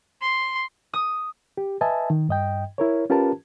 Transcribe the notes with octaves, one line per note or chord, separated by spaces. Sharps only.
C6
D#6
G4
B4 D#5 E5 G#5 A5
D#3
G2 D#5 G5
E4 A#4 C#5
C#4 F4 G4 A#4 B4 A5